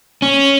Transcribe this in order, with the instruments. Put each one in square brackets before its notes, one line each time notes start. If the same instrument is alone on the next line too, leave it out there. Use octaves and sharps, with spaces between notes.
[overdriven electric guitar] C#4